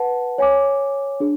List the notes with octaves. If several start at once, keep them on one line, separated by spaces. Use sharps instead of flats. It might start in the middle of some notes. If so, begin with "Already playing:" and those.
Already playing: B4 F#5 A5
C#5 G#5 D6
D4 G#4